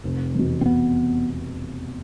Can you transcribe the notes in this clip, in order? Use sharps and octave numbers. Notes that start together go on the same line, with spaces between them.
F1
E2 B2
C4
F1 B3